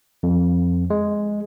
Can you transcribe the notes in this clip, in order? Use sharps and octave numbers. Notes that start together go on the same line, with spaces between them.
F2
G#3